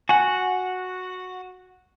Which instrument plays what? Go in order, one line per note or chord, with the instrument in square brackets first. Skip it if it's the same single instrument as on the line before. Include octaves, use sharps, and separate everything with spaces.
[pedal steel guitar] F#4 F#5 [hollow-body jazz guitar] G#5